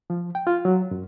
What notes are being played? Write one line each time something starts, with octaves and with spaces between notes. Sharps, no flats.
F3
G5
F4
F#3
F#2